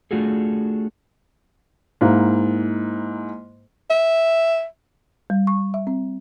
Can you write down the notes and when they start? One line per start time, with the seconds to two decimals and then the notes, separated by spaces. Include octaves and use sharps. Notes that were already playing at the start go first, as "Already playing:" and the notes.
0.11 A3 D4 F4 F#4 G#4 A4
2.01 G#2 A#3 E4
3.90 E5
5.30 G3
5.47 C#6
5.74 E5
5.87 C4